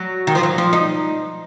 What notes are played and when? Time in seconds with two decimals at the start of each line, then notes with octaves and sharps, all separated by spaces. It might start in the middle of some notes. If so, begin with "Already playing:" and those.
Already playing: F#3
0.27 D#3
0.35 F3
0.43 F#3
0.58 F3
0.73 D#4